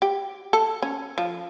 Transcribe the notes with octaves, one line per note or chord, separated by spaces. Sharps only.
G4
A4
C#4
F3